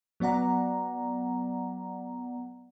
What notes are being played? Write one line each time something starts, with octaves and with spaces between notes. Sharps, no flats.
F#3 B3 D5 F#5 A#5